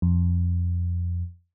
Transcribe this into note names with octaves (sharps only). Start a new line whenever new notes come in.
F2